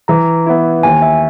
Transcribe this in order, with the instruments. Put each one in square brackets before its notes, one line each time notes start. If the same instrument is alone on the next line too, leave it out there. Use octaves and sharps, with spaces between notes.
[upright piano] E3 [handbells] A#5
[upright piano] B3 E4
[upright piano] D#2 [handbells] G#5
[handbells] E5